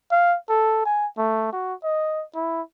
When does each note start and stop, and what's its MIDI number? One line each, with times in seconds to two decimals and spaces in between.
0.11 0.37 77
0.49 0.82 69
0.85 1.06 80
1.18 1.49 57
1.53 1.74 66
1.83 2.24 75
2.35 2.61 64